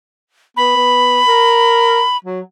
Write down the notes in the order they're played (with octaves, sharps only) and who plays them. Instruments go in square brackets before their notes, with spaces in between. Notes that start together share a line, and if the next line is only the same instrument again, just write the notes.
[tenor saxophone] B3 [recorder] B5
[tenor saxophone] B3
A#4
F#3